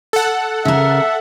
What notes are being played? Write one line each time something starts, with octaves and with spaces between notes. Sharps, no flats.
A4 F#5
C#3 A#4 E5